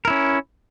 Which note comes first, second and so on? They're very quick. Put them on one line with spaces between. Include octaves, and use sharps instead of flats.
A#4 E4 C#4